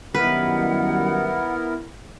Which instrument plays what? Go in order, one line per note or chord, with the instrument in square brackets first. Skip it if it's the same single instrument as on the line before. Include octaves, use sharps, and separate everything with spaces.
[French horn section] F#2 D#3 G3 [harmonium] B3 E4 A#4 [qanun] B4 [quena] F#5